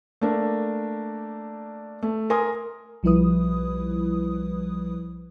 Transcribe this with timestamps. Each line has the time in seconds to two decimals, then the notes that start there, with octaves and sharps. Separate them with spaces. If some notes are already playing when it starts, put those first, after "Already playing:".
0.21 A3 A#3 D4 A#4
2.03 A3
2.30 A#4 G#5 C6 D#6
3.03 B1 F3 G3 E4 B4 D#6